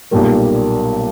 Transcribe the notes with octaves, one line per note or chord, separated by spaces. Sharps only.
B1 A#2 G3 A#3